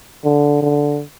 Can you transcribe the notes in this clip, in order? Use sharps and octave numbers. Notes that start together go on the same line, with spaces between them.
D3
D3